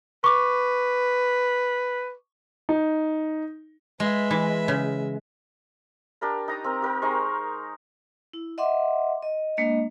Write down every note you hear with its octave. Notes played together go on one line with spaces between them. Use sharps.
B4 C#6 D6
D#4
G#3 B4 E5
E3
C#3
D4 G4 A#4 B5
D#4 A#5 D#6
C4 A#4
G4 A#4 G5
G#3 D#4 C5 C#6
E4
D#5 E5 F#5 C6 D6
D#5
G#3 A#3 D4 D#5